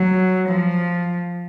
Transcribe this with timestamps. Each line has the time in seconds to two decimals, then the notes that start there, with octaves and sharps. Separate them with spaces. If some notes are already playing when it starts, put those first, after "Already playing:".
Already playing: F#3
0.49 F3